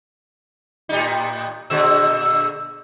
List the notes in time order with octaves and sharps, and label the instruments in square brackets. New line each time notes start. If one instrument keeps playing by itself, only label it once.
[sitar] A2 G3 D#4
[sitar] A#2 D3 G#3 [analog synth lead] E6